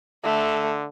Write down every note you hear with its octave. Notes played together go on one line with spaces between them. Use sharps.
D3 A3